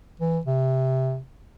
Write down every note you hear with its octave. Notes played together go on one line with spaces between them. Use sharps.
E3
C3